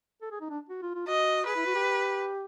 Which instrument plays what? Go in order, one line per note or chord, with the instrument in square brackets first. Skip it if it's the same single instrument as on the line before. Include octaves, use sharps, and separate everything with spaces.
[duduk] A4
G#4
D#4
D4
F#4
F4
F4
[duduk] F#4 [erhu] D#5
[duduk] G#4 [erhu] B4
[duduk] E4
F#4
G4